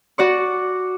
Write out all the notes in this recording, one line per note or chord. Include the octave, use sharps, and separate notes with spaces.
F#4 D5 C#6